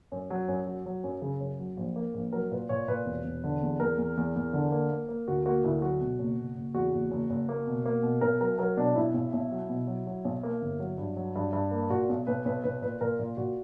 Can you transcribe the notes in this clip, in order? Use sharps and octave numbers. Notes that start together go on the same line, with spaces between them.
F#2
F#3
F#2
F#3
F#3
F#2
C#3
F#2
F#3
A#1
A#3
A#1
F#3 A#4
A#2 B4
A#2 C#5
A#2 B4
E1
E1
D3
E2
E2 A#4
E2
E2
E2
D3
A#3
A#3
A#3
D2 F#4
A#3 F#4
D2 E4
F#3 F#4
B2
F#1
F#1
F#1
E2 F#4
F#1
F#1
F#1
A#3
B2
A#3
B2
B1 A#4
F#3 A#4
F#3 A#4
B2 D4
B1 E4
B1
B1
F#3
B2
F#3
F#3
B1
A#3
G1
F#3
G2
F#3
G2
G2
A#3
A#2 F#4
B1
B1 B4
B1 B4
B1 B4
A#2 B4
A#2 A#4
A#2
A#2 F#4